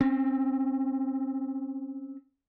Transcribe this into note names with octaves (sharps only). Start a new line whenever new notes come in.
C4 C#4